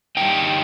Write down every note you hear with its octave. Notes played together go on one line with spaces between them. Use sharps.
G2 E3 G3 D#4 G5